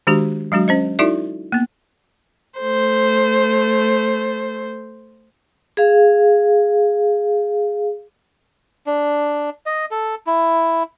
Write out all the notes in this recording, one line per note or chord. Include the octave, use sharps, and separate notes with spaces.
D#3 G#3 D4 F#4 G4
F#3 G#3 D4 F#4
C#4 C5 D#5
D#4 E4 F#4 A4 D5 E5
A#3 B3
A3 C5
G#4 F5
D4
D#5
A4
E4